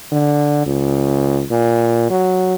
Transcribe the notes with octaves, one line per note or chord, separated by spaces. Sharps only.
D3
C#2
A#2
F#3